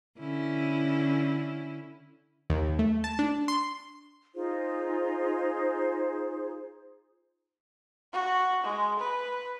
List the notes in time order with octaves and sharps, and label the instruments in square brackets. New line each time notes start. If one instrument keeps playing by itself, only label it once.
[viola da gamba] D3 C#4 E4
[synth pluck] D#2
A3
A5
D4
C6
[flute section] D#4 F4 G#4 C5
[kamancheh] F#4
G#3
B4